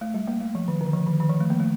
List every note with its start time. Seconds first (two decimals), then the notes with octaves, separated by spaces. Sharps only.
0.01 A3
0.14 G3
0.27 A#3
0.41 A3
0.55 F3
0.68 D#3
0.81 D3
0.93 F3
1.07 D#3
1.20 D#3
1.29 F3
1.40 A3
1.50 A#3
1.60 A3